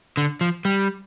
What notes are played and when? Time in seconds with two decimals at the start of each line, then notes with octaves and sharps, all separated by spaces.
0.17 D3
0.41 F3
0.65 G3